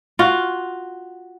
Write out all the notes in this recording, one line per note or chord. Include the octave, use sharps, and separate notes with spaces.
F4 F#4